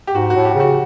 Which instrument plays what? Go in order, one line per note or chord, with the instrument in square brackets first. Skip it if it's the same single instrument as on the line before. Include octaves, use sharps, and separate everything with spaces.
[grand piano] G4
[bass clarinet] G#2 [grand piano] F#4
[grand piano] F#4
[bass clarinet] A2
[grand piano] G4
[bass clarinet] C#3 [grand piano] F#4